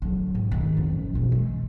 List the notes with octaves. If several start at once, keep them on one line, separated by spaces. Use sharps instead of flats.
D3 F#3
G#2
D#3
F#1 F2
B2 E3
G#3